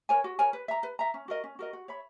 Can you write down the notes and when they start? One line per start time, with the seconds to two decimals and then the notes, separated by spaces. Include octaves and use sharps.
0.09 A#4 C#5 G#5
0.24 F#4
0.39 A#4 C#5 G#5
0.53 B4
0.68 E5 A#5
0.83 B4
0.99 E5 A#5
1.14 C#4
1.28 F#4 A#4 D#5
1.44 C#4
1.59 F#4 A#4 D#5
1.73 F#4
1.88 C#5 E5 B5